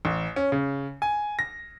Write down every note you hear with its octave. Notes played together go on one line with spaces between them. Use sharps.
A1
C#4
C#3
G#5
A#6